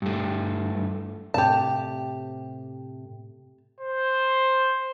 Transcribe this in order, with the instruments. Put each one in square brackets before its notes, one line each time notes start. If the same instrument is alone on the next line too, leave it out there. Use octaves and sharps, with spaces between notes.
[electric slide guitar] G2 A3
[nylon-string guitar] A2 C3 [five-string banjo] G4 A5
[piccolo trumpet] C5